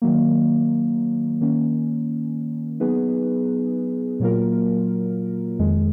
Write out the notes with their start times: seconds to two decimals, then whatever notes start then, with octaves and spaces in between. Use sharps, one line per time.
0.02 D#3 F#3 A#3
1.41 D#3 A#3 C#4
2.80 F#3 B3 D#4 G#4 B4
4.20 A#2 F#3 A#3 F4 A#4
5.59 F2 D#3 G#3